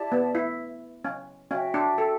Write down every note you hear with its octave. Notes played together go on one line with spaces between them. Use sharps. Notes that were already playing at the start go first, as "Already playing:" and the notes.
Already playing: E4 G4 D5 A5
B3
E4
C#4
C#4 F#4 C#5 E5 G5
D4
A4